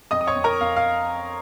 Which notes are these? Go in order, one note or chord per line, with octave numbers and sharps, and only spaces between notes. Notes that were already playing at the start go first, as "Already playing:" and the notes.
F2 D#5 D#6
D#6
C#5 C#6
F2
A#4 A#5
F2 F5
F5